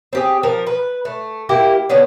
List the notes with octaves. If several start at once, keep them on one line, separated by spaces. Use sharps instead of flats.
C4 G4 G#4
F3 A#4
B4
A3
A#3 E4 G4
D3 B3 C#4 D4